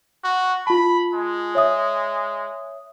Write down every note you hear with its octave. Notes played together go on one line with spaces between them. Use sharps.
F#4
F4 A5 B5
G#3
C#5 E5 D#6